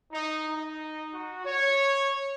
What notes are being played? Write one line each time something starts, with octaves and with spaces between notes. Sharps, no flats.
D#4
D#4
F#4
C#5